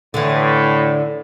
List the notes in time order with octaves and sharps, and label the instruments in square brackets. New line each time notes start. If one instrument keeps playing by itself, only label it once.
[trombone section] A2 [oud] D3 E3